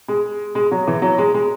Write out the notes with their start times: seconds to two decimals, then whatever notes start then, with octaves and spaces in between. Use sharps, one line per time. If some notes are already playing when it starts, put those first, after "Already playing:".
0.08 G#3
0.55 G#3
0.71 F#3
0.87 E3
1.02 F#3
1.18 G#3
1.34 G#3